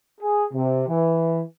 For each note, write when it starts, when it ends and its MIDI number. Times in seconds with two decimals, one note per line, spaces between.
0.21 0.44 68
0.53 0.84 48
0.89 1.41 52